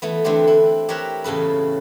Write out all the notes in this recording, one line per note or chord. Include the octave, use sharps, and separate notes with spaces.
E3 A3 B3
D3 E3 A3 C4 G4
E4
G4 A#4 C#5 E5 F#5
E2 A2 C#3 A4 B4